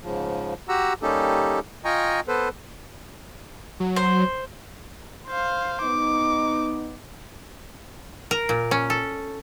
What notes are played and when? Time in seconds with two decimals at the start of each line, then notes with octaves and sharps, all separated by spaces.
0.01 G#2 C#3 F3
0.69 F#4 G4 F#5 A#5 E6
1.02 G3 A#3 C#4 D#4 G4 A4
1.85 F4 D#5 G5 G#5 A#5 C#6
2.28 B3 A4 B4 C5
3.80 F#3
3.96 C5
5.28 C5 F5
5.82 B3 D#4 D6
8.31 A#4
8.49 A#2
8.71 C#4
8.90 A4